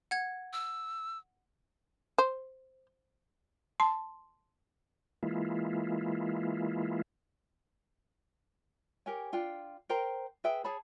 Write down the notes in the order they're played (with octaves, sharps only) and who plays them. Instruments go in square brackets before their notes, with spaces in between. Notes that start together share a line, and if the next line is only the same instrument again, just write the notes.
[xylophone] F#5 G#6
[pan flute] E6
[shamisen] C5
[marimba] A5 [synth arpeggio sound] C6
[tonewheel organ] E3 G#3 A#3 E4 F4
[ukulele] G4 A#4 C#5 G#5
D4 F4 G5
A#4 C5 G5 A#5
G#4 B4 E5 G5
G#4 C#5 A5 B5